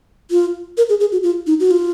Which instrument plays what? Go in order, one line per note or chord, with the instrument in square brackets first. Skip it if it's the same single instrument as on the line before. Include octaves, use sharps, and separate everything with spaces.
[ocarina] F4
A#4
G#4
G#4
F#4
F4
D#4
F#4
F4